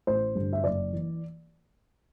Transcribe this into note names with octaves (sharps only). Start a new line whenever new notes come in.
A1 C5
G2 D3
E5
F#1 D5
E3